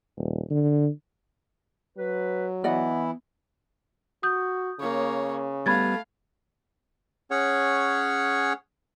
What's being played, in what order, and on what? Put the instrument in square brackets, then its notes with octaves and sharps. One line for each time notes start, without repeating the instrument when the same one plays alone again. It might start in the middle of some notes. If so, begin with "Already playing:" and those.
[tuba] D#1
D3
[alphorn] F#3 [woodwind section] B4
[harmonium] E3 E4 [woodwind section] B3 [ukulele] D5 D#5 F#5
[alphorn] F#4 [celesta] D#6 G6
[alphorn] C#3 [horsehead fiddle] A#3 C#5
[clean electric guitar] G3 B3 [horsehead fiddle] A3 F5 [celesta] B5 G#6 A6
[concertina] C#4 G#4 C#5 F#5